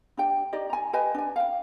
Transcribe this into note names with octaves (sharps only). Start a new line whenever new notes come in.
D4 G4 G5
D#4 G4 D5 D#5
G#5 A#5
G4 B4 D#5 G#5
D4 G#5
F5 G5